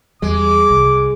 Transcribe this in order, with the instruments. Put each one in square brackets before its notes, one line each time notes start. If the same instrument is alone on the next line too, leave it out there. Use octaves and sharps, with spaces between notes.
[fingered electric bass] E2 G3 [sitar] G#3 [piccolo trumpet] D6
[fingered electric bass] C2